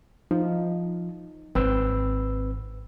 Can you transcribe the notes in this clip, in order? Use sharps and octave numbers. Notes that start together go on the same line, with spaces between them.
F3 D#4
G#1 C4 B4 E6